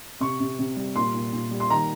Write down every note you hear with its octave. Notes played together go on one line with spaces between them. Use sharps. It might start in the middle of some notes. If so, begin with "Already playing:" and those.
C3 C#6
C3
C3
G3
A#2 C6
A#2
A#2
G3
C6
D#3 A#5